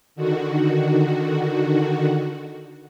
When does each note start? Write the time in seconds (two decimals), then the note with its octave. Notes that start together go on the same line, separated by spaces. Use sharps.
0.16 D3 D#3 F#4